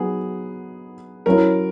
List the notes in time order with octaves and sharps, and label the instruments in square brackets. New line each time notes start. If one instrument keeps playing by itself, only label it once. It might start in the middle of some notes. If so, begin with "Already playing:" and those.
Already playing: [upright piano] F#3 B3 D#4 [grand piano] G#4
[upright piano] F#3 C#4 E4 [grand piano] A#4